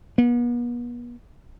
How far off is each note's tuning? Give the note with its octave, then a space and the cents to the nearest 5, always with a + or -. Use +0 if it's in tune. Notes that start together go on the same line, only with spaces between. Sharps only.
B3 -40